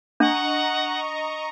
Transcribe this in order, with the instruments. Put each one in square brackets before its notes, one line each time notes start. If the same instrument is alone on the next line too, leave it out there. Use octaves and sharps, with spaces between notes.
[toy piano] D4 [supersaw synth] D#5 A#5 C#6 [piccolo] F#5